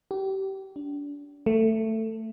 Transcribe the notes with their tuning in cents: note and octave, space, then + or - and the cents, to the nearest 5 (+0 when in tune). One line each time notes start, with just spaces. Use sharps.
G4 -30
D4 -35
A3 +15